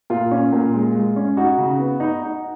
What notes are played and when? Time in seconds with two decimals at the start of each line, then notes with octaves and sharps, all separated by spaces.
0.10 A#2 F4
0.31 C#4
0.53 A#2
0.74 G#3
0.95 G#3
1.16 C#4
1.37 D#4 F#4
1.58 C#3
1.79 B3
2.00 D#4
2.22 D#4